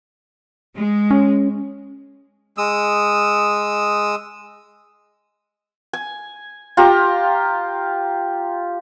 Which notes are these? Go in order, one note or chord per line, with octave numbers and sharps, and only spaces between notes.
G#3
C#4
G#3 D#6 E6
G#5
F4 G4 A#5